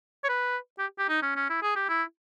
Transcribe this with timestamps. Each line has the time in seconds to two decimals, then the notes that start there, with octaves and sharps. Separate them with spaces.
0.24 C#5
0.29 B4
0.79 G4
0.99 G4
1.09 D#4
1.22 C#4
1.36 C#4
1.50 E4
1.62 G#4
1.76 G4
1.89 E4